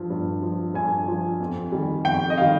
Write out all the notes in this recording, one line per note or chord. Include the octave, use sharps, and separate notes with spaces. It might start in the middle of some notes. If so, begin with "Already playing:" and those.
Already playing: G2 F3
G2
F3
G2 G#5
F3
F2
D#3 G3
F2 G5
D#5
D#3 G3 F5